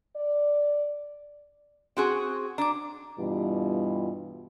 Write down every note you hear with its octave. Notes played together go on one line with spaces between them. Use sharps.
D5
C4 F#4 G#4
D4 A#5 D6
G2 B2 E3 G3 F4